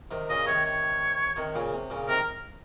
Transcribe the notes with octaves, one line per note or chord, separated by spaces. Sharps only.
C3 D#3
A#2 C#3 D#5
C3 D#3 C#5
C#5
C3 D#3
A#2 C#3
C3
A#2 C#3
C3 D#3 A#4